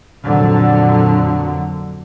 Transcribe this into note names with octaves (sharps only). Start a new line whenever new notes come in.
F2 A#2 D3 F#3